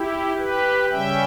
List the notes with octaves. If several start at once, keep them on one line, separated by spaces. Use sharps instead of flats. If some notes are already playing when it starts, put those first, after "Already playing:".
Already playing: E4 G4
G4 B4
C#3 G3 C#4 E5 G5